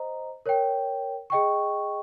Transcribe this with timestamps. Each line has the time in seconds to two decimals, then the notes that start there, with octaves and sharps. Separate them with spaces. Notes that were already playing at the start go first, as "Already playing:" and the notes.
Already playing: C5 D#5 A#5
0.46 A#4 C#5 G5
1.30 G#4 D#5 G5 C#6